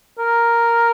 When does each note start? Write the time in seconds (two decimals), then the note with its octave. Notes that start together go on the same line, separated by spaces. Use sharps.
0.19 A#4